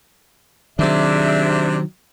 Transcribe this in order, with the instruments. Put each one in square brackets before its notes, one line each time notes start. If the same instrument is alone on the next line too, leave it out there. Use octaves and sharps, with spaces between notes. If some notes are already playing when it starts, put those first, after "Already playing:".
[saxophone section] C3 D4 [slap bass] D#3 F#3 [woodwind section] G#4 E5